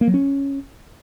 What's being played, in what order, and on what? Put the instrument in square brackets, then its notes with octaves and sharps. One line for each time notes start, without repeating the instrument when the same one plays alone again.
[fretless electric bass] A#3
F#3
C#4